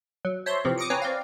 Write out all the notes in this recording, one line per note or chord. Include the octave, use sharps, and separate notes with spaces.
F#3
C5 C#5 E5 A5 C6
C3 E3 F3 C4
D6 D#6 A#6 C#7 D7
C4 B4 C#5 G#5 A#5
C4 D5 F5